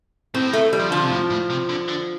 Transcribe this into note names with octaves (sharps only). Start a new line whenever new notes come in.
A2 C4
A3
G3
F3
D3 F3
C3
A2
A2
C3
D3
D3